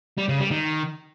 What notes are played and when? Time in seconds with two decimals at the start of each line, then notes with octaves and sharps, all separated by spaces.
0.18 G3
0.29 C#3
0.40 G3
0.51 D#3